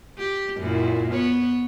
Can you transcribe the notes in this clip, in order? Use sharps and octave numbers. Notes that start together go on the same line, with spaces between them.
G4
F#2 A#2 E4
B3 C#5